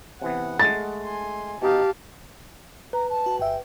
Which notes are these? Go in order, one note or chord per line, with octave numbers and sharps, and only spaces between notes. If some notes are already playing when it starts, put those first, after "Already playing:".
C3 E3 B3 F#5
G#3 A3 A6
G#5 C6
B2 D#4 G4 F5 A5
B4 A#5
A5
F#4
G1 E5 G5